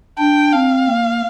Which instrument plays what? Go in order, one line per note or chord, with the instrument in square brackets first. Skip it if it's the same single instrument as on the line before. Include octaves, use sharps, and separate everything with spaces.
[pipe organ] D4 [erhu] G5
[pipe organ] C4 [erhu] F5
[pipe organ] A#3